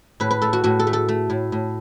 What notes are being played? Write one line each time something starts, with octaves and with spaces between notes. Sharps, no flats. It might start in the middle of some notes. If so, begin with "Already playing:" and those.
A2 B4
B4
A3 A4
F#4
A2 F#4
A4
A3
A4
A3
A2
A2